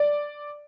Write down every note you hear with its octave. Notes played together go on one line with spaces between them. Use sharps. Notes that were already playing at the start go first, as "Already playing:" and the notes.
Already playing: D5